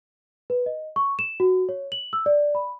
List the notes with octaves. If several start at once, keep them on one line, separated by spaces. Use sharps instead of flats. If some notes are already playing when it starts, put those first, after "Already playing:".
B4
D#5
C#6
E7
F#4
C#5
F#7
E6
D5
B5